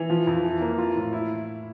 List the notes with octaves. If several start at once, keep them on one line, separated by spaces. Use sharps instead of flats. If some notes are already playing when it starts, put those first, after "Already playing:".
Already playing: E3
F3
F2
E3
A#3
F4
A2
E4